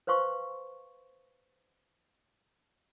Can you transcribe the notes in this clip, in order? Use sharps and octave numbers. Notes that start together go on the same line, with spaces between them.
B4 C5 F5 C6 C#6